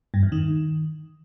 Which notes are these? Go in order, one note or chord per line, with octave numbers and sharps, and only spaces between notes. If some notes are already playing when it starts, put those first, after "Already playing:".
G2
E2
D#3